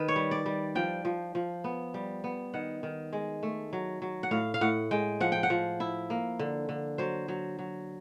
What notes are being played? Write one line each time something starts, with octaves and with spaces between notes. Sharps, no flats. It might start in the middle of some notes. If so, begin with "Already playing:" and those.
Already playing: D#3 B4
C#5
G3
D5
G3
F3 G5
F3
F3
B3
G3
B3
D#3 F#5
D#3
G#3
A3
F#3
F#3
F#5
A2 F5
F5
A2 F#5
G#3 G5
F3 F#5
G5
F#5
F3
E4
A#3
D3
D3
F#3 C5
F#3
F#3